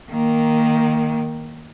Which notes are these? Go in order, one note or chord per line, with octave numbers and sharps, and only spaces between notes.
D#3 A#3